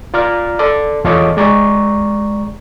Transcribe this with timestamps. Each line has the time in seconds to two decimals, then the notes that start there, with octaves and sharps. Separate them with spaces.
0.14 F4 D5 A#5 F6
0.59 A4 D5
1.04 E2 F4 A4 C#5 D#5 D6
1.37 G#3 D5 A#5 C#6